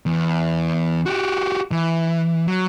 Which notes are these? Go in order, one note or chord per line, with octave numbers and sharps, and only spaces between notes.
E2
F#4 G4
E3
F#3